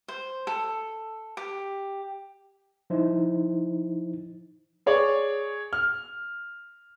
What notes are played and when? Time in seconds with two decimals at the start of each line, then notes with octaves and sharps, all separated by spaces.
0.08 C5
0.47 A4
1.37 G4
2.90 F3 D#4 E4 C5
4.86 G#4 C#5 D5
5.73 F6